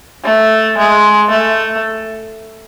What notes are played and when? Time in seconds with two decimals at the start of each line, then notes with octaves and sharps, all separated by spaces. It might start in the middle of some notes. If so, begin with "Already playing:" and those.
0.24 A3
0.78 G#3
1.30 A3